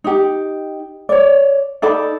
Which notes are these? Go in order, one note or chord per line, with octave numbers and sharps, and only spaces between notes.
D#4 G4
C#5 D5
D#4 A4 D5 B5